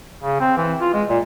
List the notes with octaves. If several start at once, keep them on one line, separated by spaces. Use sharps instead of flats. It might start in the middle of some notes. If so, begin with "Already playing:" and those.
C#3
C4
E3
F4
G#3
A#2